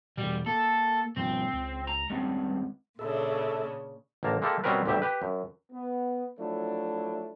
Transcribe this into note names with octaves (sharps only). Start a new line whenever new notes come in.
B2 E3 G3
A#3 A4
B2 F3 G3 C4
C#2
A#5
G2 G#3 C4 C#4
A#2 C#3 D4 A4 E5
A1 D3 A#3 A5 A#5
G#3 A#3 E4 G4 A4
B2 G3 C4 C#4 A#4 B4
G1 D2 G3 G4 E5
G4 B4
F#2
B3
F3 F#3 A3 D4 E4